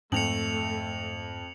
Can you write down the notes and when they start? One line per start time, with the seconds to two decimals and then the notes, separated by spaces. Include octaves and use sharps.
0.12 F2 G#2 A3 C#7 F7 F#7